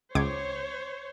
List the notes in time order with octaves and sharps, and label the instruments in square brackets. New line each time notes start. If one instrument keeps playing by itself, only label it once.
[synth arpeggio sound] C#2 D6 G#6 [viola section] C5 C#5